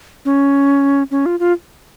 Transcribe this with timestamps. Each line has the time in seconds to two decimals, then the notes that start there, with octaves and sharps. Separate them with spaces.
0.25 C#4
1.11 C#4
1.26 F4
1.40 F4